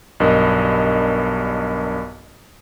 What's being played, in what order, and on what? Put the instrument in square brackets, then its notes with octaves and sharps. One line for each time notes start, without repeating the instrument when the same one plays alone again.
[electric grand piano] B1 G2 A#4 D#5 D#6